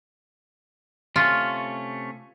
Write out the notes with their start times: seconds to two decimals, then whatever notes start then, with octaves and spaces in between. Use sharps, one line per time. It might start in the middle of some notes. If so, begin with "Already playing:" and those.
1.16 C3 A3 C#4 F4